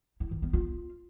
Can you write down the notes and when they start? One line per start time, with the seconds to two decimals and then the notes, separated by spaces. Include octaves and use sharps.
0.20 E4
0.31 D#3
0.42 B3
0.53 F4